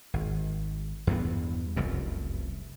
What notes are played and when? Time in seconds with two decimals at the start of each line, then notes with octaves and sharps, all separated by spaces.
0.14 G#1
1.07 E2 G2 B3
1.76 F1 C2 F#2